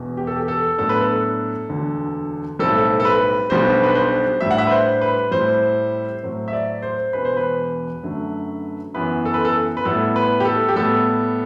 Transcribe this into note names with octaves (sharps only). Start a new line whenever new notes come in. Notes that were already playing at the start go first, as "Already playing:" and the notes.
Already playing: E1 E2 B2
G4
A4
G4
A4
A2 F#3 B3 D4 A4
B4
A4
E1 D2 D3
B1 A2 G3 C4 A4
A4
B4
B1 B2 G3 B3 D4 C5
B4
C5
A2 G3 D4 E5
F#5
E5
B4
C5
B4
A2 G3 C4 E4 C5
A2 F#3 C4
E5
D5
C5
E1 E2 B2 B4
C5
B4
F#2 D3 F#3 A3
F#2 E3 B3 E4 B4
A4
B4
A4
B4
A2 G3 B3 E4 A4
B4
G4
A4
G4
A2 G3 B3 A4